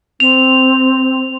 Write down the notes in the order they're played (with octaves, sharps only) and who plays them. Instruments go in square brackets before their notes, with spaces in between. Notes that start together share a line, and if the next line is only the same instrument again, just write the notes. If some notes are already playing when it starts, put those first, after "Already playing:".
[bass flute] C4 [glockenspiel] F7